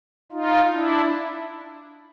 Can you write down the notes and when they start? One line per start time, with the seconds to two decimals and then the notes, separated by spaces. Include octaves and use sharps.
0.32 D#4 F4
0.72 D4 E4